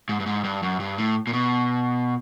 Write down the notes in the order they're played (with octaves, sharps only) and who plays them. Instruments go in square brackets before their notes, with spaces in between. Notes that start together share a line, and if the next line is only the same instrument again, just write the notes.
[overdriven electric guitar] G#2
G2
G#2
G2
F#2
G2
A2
A#2
B2